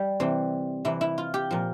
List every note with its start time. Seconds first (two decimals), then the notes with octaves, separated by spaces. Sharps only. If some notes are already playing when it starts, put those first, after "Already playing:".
Already playing: G3
0.20 C3 E3 C4
0.85 C3 E3 E4
1.01 E4
1.18 F4
1.34 G4
1.51 A#2 F3